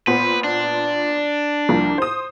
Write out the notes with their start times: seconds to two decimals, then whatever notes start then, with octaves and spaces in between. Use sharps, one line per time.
0.07 A#2 B3 B4 C5
0.44 D4
1.69 C2 F3 A#3
1.98 C5 D#6